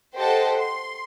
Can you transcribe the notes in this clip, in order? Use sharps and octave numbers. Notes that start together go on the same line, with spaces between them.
G4 A4 C5 D#5 F#5 A5
C6